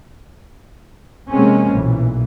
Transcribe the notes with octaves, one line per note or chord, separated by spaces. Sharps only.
C3 F3 G#3 A#3 C4 C#4
B1 A#2 E3